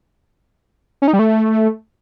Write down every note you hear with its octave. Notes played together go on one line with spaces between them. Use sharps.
C#4
D#4
G3
A3